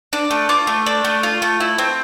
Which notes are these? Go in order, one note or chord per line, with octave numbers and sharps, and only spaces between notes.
D4
A3
F4 D6
A3
D4
A3
F4
A3
E4
C4